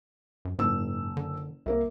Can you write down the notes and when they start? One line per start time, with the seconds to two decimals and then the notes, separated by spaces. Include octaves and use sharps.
0.45 F#2
0.59 F#1 G#2 E6
1.17 D3
1.66 C2 A#3 A#4 E5